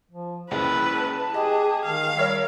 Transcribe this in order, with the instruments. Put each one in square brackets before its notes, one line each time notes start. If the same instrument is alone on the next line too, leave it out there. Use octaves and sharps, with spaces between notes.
[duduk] F3
[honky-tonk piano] F#1 C#2 [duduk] E4 [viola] B4
[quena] A5
[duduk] G4 [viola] G#4 [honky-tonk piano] D#5
[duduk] D#3 [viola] F5
[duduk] G3 [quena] A#4 [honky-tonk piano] C#5 E5